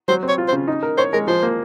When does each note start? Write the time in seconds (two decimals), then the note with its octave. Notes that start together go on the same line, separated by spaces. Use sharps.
0.08 F#3 C5
0.23 C4
0.28 C#5
0.38 F4
0.48 C5
0.53 C#3
0.68 D#4
0.83 A#4
0.98 C5 C#5
1.13 G#3 A#4
1.27 F3 C5
1.42 A#3